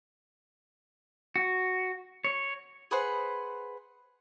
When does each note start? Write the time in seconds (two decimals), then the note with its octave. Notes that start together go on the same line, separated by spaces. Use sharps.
1.36 F#4
2.24 C#5
2.91 G#4 B4 C5 F#5